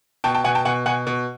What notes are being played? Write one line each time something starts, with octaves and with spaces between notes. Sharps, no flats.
B2 G5 A5
G5 A5
B2 F#5 G#5
G5 A5
B2 F#5 G#5
B2 F#5 G#5
B2